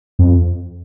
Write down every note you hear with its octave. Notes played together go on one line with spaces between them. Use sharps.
F2